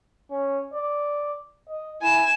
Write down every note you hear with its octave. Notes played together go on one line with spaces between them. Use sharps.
C#4
D5
D#5
E4 G#5 E7